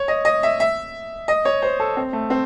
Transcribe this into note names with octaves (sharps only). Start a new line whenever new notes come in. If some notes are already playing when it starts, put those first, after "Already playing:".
Already playing: C#5
D#5
D#5
E5
E5
D#5
C#5
C5
A4
C4
A3
C4